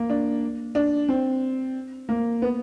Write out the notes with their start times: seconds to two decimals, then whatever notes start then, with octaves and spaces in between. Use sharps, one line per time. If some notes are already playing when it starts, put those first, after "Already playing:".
Already playing: A#3
0.10 D4
0.75 D4
1.09 C4
2.09 A#3
2.42 B3